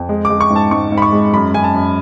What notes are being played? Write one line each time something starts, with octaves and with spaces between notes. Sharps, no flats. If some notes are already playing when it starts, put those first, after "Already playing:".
Already playing: F2
G#3
D6
G#3
C#6
G#2
A5
G#2 C#6
G#2
B5
C#6
G#3
F#2 B5
F#2 G#5
A5
F#2